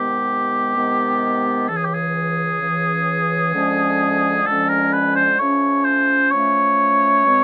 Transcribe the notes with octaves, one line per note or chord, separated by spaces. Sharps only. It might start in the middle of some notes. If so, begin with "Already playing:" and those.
Already playing: C3 D#3 G#3 B3 G4
C3 D#3 G#3 B3
C#2 C#3 E3 A4
G#4
G4
G#4
C#2 C#3 E3
F2 D3 F3 G#3 C#4
F2 D3 F3 G#3 C#4 A4
A#4
B4
C5
F3 A3 C#4 C#5
C5
F3 A3 C#4 C#5
B2 G#3 C4